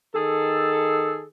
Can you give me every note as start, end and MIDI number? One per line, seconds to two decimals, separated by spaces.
0.14 1.25 51
0.14 1.25 68
0.14 1.25 69